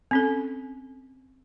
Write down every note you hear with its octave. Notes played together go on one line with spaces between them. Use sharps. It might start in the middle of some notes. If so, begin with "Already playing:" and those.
C4 C#4 A4